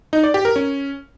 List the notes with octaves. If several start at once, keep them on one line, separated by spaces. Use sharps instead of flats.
D#4
D5
G4
A#4
C#4